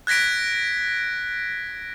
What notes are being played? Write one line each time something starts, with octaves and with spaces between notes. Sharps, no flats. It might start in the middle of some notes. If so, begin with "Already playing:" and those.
F#6 G#6 A#6 B6 D7